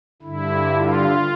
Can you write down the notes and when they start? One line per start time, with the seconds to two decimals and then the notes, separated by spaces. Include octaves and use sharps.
0.22 G2 D3 E4
0.75 F4